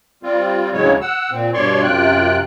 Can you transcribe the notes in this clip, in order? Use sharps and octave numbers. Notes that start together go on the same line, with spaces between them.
G3 C4 F4
D2 A2 C#3 F#3 G#3 C#5
F#5 E6
A#2 C4
G2 B2 C#5 D5 C6 C#6
F#2 C3 F4 G5 F#6